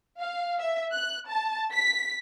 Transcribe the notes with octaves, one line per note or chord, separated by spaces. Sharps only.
F5
E5
F#6
A5
B6